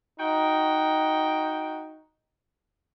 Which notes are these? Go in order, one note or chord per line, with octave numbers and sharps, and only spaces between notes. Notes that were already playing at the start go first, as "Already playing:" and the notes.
D#4 F#4 G5